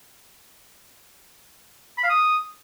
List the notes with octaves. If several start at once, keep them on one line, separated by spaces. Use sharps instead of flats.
B5
F5
D#6